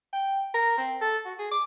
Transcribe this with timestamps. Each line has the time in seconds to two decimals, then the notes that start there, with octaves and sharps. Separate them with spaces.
0.13 G5
0.54 A#4
0.77 C4
1.01 A4
1.25 F#4
1.39 G#4
1.51 D6